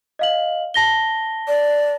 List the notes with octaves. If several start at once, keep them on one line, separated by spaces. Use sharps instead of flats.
D#5 F5 F#7
A5 A#6 G7
D5